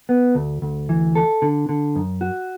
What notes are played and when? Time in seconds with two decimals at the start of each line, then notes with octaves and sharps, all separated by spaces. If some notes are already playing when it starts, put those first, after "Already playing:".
0.09 B3
0.35 D2
0.62 D2
0.89 E3
1.15 A4
1.42 D3
1.69 D3
1.96 F#2
2.21 F#4